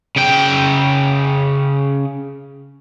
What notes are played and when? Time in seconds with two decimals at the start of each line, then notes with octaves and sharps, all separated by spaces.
0.16 C#3 G5